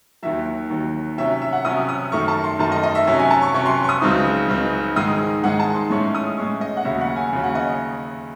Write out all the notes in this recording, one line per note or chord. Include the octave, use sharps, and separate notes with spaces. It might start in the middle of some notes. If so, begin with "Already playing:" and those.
D#2 D#3 F#3 E5
D#2 D#3 F#3
C3 F#3 C#4 E5
E5
F#5
C3 F#3 C#4 D#6
D#6
F#2 D#3 A3 C#6
A5
C6
F#2 D#3 A3 A5
D#5
D#5
E5
C3 F#3 C#4 E5
G#5
A5
C#6
C3 F#3 C#4 C#6
C6
C#6
D#6
C#2 C#3 F#3 C4 D#4
C#2 C#3 F#3 C4 D#4
G#2 D#3 G#3 D#4 D#6
G#2 D#3 G#3 D#4 F#5
A5
C6
A2 G#3 C#4 C#6
D#6
A2 G#3 C#4 C#6
D#5
F#5
D#2 C#3 F#3 C#4 E5
F#5
G#5
D#2 C#3 F#3 C#4
F#5
D#5